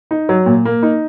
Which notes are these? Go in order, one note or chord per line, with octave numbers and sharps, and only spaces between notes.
D#4
F#3
A#2
A#3
D#4